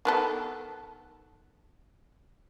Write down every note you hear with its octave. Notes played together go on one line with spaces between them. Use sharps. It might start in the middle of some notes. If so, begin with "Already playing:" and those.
D#3 B3 A4